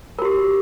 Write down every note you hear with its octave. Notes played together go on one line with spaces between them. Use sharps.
F#4 G4 A#4